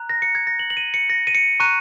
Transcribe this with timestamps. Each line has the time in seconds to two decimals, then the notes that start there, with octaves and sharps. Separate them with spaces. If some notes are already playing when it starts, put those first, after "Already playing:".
Already playing: A#5 F#6
0.09 A#6
0.22 C#7
0.35 G#6
0.47 A#6
0.59 F#7
0.70 F#7
0.77 D#7
0.94 C#7
1.10 A#6
1.27 D#7
1.35 C#7
1.60 A#5 C#6 F#6 D#7